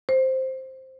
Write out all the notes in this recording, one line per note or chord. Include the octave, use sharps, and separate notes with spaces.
C5